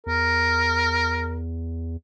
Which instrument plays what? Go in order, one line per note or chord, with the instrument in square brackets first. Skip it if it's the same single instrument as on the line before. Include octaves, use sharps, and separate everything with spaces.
[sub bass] E2 [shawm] A#4